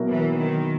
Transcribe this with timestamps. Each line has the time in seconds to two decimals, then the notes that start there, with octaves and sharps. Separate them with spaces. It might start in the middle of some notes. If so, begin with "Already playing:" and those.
Already playing: B2 F#3 A#3 E4 A#4
0.09 E3
0.38 D#3